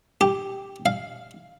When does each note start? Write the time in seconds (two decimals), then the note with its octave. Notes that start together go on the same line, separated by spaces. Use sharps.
0.21 G4
0.86 F5